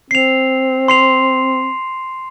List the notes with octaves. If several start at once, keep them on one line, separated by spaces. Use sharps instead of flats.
C4 C7 F7
C6 C7 F7